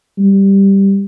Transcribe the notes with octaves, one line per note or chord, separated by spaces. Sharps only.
G3